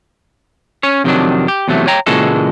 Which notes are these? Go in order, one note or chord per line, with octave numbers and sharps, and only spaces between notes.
C#4 C#5
F2 C3 D#3 E3 F#3 D4
G4
E2 C3 F#3 A3
C#5 G5 A#5
A#2 C#3 E3 G#3 F#4 A4